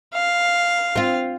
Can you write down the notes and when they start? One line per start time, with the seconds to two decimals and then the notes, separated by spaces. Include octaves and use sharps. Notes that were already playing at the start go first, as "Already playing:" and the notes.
0.14 F5
0.96 C4 F4